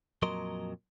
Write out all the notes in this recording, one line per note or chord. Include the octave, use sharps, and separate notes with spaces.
F2 A#2 F#3 A#4 D#5 C6